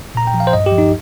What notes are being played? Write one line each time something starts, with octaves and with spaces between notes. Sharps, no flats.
A#2 A#5
G5
F3
F5
C5
G2 D#5
G4
F3
D#4